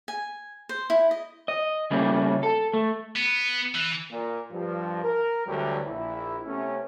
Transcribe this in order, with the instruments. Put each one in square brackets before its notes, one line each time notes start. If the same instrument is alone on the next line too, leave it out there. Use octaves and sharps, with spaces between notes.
[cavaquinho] G#5
C5
E4
D#5
[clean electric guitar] D#5
C#3 G3 A3 A#3 C#4
A4
A3
[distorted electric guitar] B3
E3
[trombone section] A#2
G2 F3
A#4
D2 D3 E3 F#3 G3
A#1 E4
C3 A3 B3 C#4